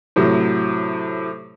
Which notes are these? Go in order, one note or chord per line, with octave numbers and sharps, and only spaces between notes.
A2 C3 F#3